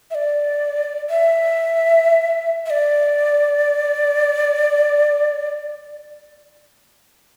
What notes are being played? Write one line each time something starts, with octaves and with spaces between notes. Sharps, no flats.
E5
D5
E5
E5
D5